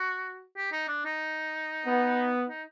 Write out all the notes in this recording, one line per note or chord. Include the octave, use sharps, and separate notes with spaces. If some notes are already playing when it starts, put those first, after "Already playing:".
Already playing: F#4
G4
D#4
D4
D#4
B3
D#4